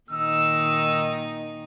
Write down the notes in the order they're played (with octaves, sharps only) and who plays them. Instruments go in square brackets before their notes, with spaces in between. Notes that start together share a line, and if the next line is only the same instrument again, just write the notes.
[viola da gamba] A#2 D#3 D#4 [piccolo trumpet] E6